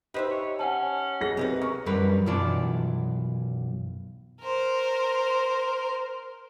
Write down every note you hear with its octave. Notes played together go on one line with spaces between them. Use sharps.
D#4 G4 B4 C5 E5
C#5
C#4 F#5 G#5 A5
B1 G#4 A#6
C3 D#3 E3 B4
C#4 A#4 C#6
F#2 G3 A#4 B4
B1 F#2 E3 F4 D5 A5
A#4 C5